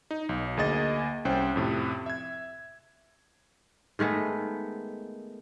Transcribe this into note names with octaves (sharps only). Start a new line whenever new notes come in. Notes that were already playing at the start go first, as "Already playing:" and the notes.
D#4
B1
D2 A#3 G#4 D#5 A6
C2 C#4 C5 G5 F#6
F2 A2 C3
E5 G#6
D#3 G#3 A3 B3